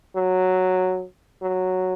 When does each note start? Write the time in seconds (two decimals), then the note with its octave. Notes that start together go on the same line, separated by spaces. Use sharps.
0.16 F#3
1.42 F#3